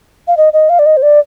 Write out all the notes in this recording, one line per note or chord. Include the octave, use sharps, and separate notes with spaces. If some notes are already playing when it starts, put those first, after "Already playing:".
F5
D#5
D#5
F5
D5
D#5
C5
D5